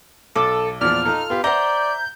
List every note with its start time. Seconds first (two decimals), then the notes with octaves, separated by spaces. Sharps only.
0.36 B1 A4 D6
0.81 E2 A#2 F3 D5 F6
1.06 D#4 F4 A4
1.30 B3 F4 G4
1.44 C5 D5 E5 F#5 A#5 G6